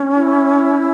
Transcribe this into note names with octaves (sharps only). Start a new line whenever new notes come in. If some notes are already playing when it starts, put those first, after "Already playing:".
Already playing: C#4
E4